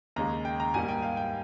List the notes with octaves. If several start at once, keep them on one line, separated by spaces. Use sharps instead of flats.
D#2 C#3 G#3 A#5
G5
A#5
G#2 G3 A#3 G#5
G5
F5
G5